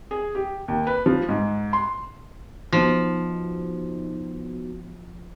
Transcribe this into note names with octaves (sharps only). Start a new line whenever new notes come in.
G#4
G4
D#2
B4
F3
G#2
C6
F3 B3 D#4 F#4